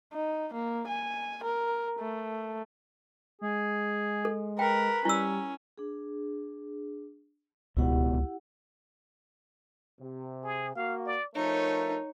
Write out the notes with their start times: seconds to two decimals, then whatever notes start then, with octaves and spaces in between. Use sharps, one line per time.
0.13 D#4
0.54 A#3
0.88 G#5
1.44 A#4
2.00 A3
3.41 G#3 G#4
4.25 A4
4.59 A#4 B4 G5
5.05 G3 C#4 E4 E6
5.78 D4 G#4
7.77 D1 C#2 B2 E4 G4 F#5
10.00 C3
10.44 G#4
10.75 A#3 F#4 F5
11.06 D5
11.35 F3 A3 D#4 A#4 C#5